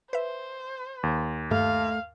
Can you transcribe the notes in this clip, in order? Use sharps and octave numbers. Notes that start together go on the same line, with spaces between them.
B4 C5 E5
D#2
G2 A3 F5